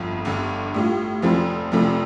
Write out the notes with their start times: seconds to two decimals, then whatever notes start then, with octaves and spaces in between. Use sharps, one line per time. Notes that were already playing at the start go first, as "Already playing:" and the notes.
Already playing: G1 F2 F3
0.25 G1 G2 D3
0.74 A2 G3 F4
1.22 F1 F2 F3 A3 C4
1.72 F1 F2 C3 F3 A3